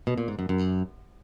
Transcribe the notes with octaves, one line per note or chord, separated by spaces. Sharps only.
B2
A#2
G#2
F#2
F#2